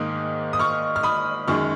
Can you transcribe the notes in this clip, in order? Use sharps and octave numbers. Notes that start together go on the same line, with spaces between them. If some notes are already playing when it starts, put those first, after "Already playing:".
Already playing: G#2 D#3 A#3 D#6
D#6
C#6 F6
F6
B5 D#6
F#2 D#3 G#3 C#6 F6